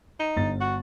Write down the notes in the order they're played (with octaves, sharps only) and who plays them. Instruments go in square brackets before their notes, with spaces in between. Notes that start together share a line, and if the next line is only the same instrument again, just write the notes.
[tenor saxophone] D#4
[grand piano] G1 A6
[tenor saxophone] F#4